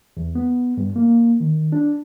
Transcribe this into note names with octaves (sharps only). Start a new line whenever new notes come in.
E2
B3
G2
A#3
D#3
D4